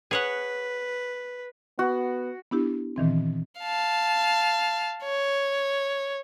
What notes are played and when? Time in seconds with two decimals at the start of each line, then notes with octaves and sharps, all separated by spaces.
0.11 G#4 B4 C#5 F#5
1.79 B3 F#4
2.51 B3 D4 E4 G4
2.96 A#2 D#3 E3 C4
3.61 F5 A5
5.05 C#5